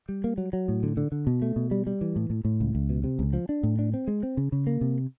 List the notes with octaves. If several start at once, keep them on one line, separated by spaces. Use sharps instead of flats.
G3
A#3
F#3
F#3
A2
D3
D3
D3
B2
A3
B2
G3
G3
E3
A2
A2
A2
C#2
C#2
B2
C3
C#2
F3
D4
A2
D4
C4
G#3
C4
C#3
C#3
A#3
C3